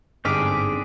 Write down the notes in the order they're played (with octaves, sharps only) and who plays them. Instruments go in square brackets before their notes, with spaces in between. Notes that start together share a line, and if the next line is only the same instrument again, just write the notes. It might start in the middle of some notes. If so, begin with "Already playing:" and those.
[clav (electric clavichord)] G1 G#2 [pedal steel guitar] C4 D4 G#4 [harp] D6 F6 B6